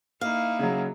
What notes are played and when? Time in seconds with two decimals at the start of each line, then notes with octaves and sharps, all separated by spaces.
0.21 A#3 D#4 E4 F5
0.59 C#3 F#3